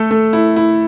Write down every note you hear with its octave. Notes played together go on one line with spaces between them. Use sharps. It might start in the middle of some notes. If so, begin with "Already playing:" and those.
Already playing: A3 A4
A3
E4
E4